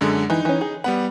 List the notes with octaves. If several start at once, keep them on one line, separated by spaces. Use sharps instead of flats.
F#2 D3 G#3
E3 D#4
E3 C#4
G#4
G3 B3 F#5 B5